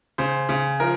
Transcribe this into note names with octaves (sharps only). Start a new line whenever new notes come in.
C#3 C5
C#3
F3 A#4